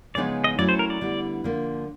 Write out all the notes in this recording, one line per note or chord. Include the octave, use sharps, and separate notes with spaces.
C#3 F3 G#3 B3 D#4 D5
D#5
F#3 A3 C#4 E4 D5
C5
A#4
D5
D3 G3 B3 E4
D3 F3 A#3